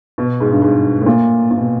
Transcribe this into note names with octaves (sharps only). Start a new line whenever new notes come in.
B2
G#2
G2
G#2
A2
A#2
A#2
B2